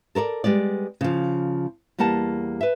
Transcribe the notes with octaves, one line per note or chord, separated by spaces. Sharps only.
A4 A#4 C#5 D5
G3 G#3 B3 D5
C#3 F3
E2 G3 A#3 F#5 A5
B4 E5